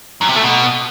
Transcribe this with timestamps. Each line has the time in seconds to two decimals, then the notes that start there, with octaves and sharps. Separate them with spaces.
0.21 F#2
0.29 C3
0.36 A3
0.44 B2